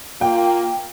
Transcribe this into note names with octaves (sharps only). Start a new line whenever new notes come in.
A#3 F4 G5